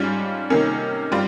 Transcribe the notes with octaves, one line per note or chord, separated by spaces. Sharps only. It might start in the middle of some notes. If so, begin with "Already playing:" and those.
Already playing: G#2 G3 C#4 F4
C3 D#3 A#3 C#4
G3 C4 F4